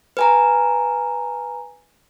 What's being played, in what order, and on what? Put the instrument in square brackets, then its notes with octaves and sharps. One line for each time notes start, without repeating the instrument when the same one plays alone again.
[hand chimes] B4 G#5 A#5